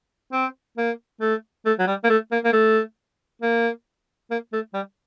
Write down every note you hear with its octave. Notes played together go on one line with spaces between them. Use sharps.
C4
A#3
A3
A3
F#3
G3
A#3
A3
A#3
A#3
A3
A#3
A#3
A3
G3